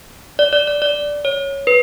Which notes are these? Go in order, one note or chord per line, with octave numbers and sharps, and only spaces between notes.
D5
D5
D5
D5
C#5
B4